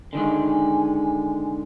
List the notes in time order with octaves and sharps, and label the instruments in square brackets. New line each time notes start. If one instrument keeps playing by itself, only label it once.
[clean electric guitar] D3 D#3 G#3 [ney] G#5